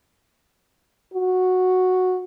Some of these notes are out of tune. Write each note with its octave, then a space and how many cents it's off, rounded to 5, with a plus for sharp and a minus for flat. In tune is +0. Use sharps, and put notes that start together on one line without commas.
F#4 -5